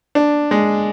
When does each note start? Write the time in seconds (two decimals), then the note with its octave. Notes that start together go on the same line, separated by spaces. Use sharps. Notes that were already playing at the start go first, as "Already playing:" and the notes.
0.15 D4
0.51 G#3